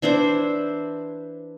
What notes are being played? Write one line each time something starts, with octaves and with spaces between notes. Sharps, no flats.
E3 D4 E4 C5